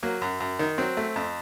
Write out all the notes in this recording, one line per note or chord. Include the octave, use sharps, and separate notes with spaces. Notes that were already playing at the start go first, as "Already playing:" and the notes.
F#3 A#3
F#2
F#2
D#3
F#3 C4
A3
F2